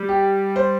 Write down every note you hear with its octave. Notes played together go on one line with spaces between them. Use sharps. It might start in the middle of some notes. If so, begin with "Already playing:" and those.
Already playing: G3
G4
C5